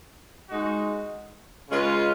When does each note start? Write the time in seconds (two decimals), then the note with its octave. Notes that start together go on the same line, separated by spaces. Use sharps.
0.49 G#3 D#4 F#4
1.69 C#3 G#3 C#4 F4 B4